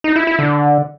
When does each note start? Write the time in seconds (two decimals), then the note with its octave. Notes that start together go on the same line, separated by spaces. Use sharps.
0.04 D#4
0.16 E4
0.27 E4
0.39 D3